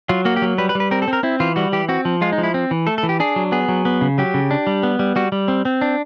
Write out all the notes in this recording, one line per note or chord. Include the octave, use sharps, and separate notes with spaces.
F#3 F4
A#3 F#4
G4
F#3
G3 B4
B4
G3
B4
C4 A#4
A4
C4
A#4
C4 E4
E3 F4
G3 F#4
E3 G4
C4 F#4
F3
G#3 F4
D#4
F3
E4
C4
E3
A3 A4
A4
E3
G4
D4 G#4
F#3
B3 G#4
F#3
B3
C#3
F#3 G4
C#3
D4
G3
B3
G3
G3 F#4
G3
C4
C4
D4